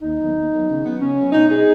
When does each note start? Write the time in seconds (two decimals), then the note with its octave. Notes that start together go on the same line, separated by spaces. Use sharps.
0.01 D#2 D#4
0.18 D#3 F#3 B3
0.35 D#2
0.50 D#3 F#3 B3
0.68 C#3
0.83 F#3 B3
1.00 C#3 C#4
1.17 F#3 B3
1.33 B2 D#4
1.49 G#3 B3 D#4 G#4